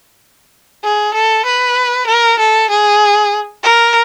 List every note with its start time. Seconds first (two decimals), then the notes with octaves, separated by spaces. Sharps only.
0.84 G#4
1.14 A4
1.46 B4
2.07 A#4
2.39 A4
2.70 G#4
3.64 A#4